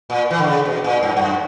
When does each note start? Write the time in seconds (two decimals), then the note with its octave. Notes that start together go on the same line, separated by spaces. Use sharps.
0.10 A#2
0.30 E3
0.39 D3
0.47 C#3
0.65 B2
0.84 A#2
1.03 G2
1.17 G2
1.22 F#2